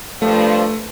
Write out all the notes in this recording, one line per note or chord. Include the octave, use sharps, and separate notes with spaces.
G2 F3 A3